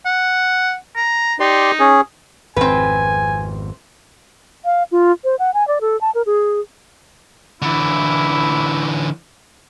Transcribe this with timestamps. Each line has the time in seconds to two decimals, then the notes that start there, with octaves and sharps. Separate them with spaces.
0.06 F#5
0.96 A#5
1.40 D#4 G4 D5 C6
1.80 C#4 G#4
2.56 G#1 F2 C4 B4 G#5
4.65 F5
4.92 F4
5.24 C5
5.39 F#5
5.54 G#5
5.68 D5
5.81 A4
6.01 A5
6.15 A#4
6.26 G#4
7.62 D3 E3 E4